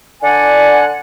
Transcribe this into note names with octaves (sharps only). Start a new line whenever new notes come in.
D3 D5 F#5 G#5